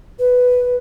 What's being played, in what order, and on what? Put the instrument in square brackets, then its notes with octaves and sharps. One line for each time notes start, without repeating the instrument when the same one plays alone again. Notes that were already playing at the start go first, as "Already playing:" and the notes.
[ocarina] B4